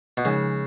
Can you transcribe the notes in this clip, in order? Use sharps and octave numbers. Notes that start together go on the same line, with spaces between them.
B2
C#3 F3 G#3 D#4